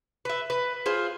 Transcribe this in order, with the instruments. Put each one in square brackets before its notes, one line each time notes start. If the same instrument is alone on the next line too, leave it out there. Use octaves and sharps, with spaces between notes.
[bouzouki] B4 E5
B4
F4 G#4 C5